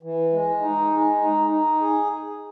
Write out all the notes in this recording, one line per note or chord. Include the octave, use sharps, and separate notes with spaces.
E3
G#3
D#4
G#3
D#4
D#4
G#4